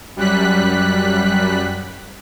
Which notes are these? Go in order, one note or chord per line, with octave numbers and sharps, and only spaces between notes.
F#2 G3 F#6 B6